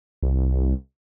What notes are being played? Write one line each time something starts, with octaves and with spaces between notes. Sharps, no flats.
C2